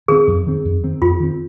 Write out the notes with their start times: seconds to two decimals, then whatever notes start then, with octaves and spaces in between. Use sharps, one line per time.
0.08 D#3 C4 G#4
0.27 F2
0.47 D#3 C4
0.65 F2
0.84 D#3 C4
1.01 F2 F4
1.20 D#3 C4